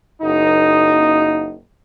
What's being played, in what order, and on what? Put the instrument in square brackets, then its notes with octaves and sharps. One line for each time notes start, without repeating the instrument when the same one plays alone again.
[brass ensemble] F#1 D#4